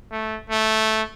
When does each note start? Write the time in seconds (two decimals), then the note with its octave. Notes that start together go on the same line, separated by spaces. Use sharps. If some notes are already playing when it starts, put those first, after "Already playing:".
0.12 A3
0.50 A3